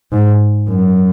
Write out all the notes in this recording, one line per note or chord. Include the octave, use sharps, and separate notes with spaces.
G#2
F#2